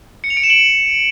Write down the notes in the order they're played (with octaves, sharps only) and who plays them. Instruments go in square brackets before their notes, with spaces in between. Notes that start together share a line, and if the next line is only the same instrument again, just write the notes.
[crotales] C#7
F7
D7
E7
F#7